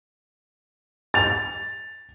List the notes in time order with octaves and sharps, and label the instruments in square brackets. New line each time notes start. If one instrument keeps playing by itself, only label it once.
[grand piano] A6 F7